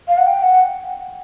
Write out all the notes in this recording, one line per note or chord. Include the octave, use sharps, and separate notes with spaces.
F5
F#5
G5
F#5